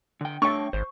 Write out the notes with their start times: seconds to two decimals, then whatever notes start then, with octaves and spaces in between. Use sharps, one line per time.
0.21 D3 G5
0.42 A3 D4 C#5 G5 C#6
0.73 G#1 C5